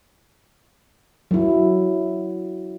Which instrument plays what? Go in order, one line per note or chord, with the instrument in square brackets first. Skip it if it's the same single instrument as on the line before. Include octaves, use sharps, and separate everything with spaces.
[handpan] F#3 E4